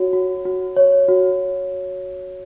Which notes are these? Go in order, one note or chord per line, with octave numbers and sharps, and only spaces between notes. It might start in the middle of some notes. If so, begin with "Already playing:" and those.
Already playing: F#4 C#5
F#4
F#4
C#5
F#4